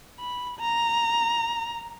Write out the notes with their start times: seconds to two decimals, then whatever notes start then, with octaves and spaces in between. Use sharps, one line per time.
0.19 B5
0.59 A#5